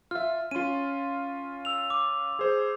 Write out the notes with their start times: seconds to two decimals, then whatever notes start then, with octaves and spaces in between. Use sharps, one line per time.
0.11 F4 E5 F6
0.51 C#4 F4 C6 D#7
1.65 E6 F7
1.90 D6
2.39 G#4 C5